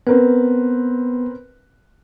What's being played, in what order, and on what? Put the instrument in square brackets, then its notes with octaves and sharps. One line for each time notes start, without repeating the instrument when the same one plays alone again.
[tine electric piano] B3 [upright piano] C4 A#4 B4